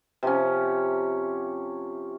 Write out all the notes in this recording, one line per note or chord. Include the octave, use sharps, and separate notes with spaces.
C3 F3 C#4